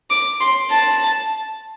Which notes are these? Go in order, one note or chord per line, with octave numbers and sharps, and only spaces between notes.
D6
C6
A5